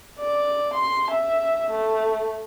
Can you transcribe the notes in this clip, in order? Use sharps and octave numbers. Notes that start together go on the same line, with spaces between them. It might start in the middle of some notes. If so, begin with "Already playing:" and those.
D5
C6
E5
A3